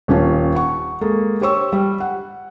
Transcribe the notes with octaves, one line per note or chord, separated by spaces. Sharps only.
D#1 C#4 F4
F#5 C#6
G#3 A#3 A4
G4 C5 C#5 C#6 E6
G3
F#5